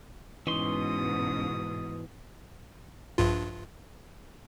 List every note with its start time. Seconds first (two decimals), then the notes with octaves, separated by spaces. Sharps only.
0.47 G#2 B2 E3 C#4 D#4 C6 D#6
3.18 A#1 G2 F4